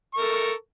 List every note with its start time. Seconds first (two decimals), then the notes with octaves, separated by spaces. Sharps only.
0.14 C#6
0.17 A#4
0.21 A4